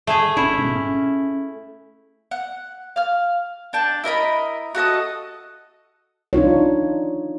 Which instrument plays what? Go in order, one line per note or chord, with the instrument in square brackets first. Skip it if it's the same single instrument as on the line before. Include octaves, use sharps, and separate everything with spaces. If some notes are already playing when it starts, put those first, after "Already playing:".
[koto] A3 G#4
[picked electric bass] G#1 C#4 D4 [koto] E4
[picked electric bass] G#2 B2 G#3
C#4
[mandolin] F#5
F5 F6
D4 G5 A5
E4 A#4 D#5 B5
F#4 A4 D#5 D#6
[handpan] D4 D#4 F4 C#5